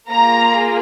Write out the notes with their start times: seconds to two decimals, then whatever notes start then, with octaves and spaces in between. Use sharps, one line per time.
0.10 A#3 F4 G#4 A#5